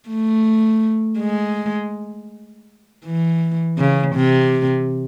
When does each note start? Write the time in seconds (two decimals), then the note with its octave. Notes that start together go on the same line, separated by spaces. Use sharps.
0.09 A3
1.19 G#3
3.05 E3
3.78 C#3
4.15 C3